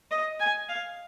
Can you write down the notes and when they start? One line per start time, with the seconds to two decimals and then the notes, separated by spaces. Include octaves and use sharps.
0.11 D#5
0.40 G#5
0.69 F5